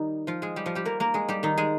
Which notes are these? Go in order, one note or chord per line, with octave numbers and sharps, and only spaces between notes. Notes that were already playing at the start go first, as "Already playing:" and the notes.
Already playing: D#3 G3 D#4
F3 F4
G#3 G#4
G3 G4
F3 F4
G3 G4
A#3 A#4
A#3 A#4
G#3 G#4
G3 G4
D#3 D#4
G#3 G#4